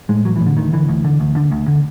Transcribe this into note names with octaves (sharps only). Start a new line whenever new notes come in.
A2 G#3
A1 F#3
E3
A2
D3
D2 D#3
D3 E3
D2
D3
D2
D3
D2
D3